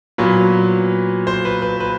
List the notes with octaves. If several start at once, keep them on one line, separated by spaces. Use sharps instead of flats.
A#2 F#3 B3 B4
C5
B4
B4
B4